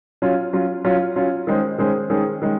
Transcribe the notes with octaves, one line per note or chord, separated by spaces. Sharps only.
F#3 C#4 F4
F#3 C#4 F4
F#3 C#4 F4
F#3 C#4 F4
D#3 G#3 C#4 G#4 C5
D#3 G#3 C#4 G#4 C5
D#3 G#3 C#4 G#4 C5
D#3 G#3 C#4